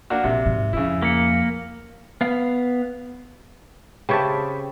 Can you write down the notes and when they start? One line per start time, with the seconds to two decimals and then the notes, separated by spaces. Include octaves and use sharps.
0.10 A#3 D4 F#4
0.24 A#1 C3 E5
0.46 G#2
0.73 F2 C#3 E4
1.02 A#3 B6 C#7
2.21 B3 F5
4.09 C#3 C4 G4 C#5 E5 G5 A5 B5